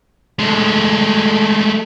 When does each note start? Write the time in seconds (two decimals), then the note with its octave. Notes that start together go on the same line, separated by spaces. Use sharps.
0.39 G#3 A3